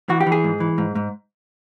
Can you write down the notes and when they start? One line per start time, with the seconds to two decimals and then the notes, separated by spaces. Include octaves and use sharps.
0.09 E3 F#4
0.21 G4
0.26 E3
0.32 G#4
0.44 G#2
0.60 E3
0.78 G#2
0.95 G#2